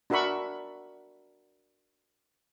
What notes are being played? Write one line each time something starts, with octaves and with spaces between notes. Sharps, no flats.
D4 F#4 A#4 E5 B5 C#6